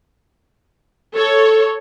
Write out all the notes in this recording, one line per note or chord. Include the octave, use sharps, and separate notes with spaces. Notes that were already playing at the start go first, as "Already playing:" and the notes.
A4 C#5